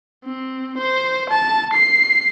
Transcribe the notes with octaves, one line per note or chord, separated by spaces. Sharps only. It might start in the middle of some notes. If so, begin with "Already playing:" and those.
C4
C5
A5
C7